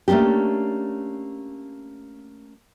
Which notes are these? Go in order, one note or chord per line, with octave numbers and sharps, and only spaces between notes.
A3 A#3 C#4 D4 G4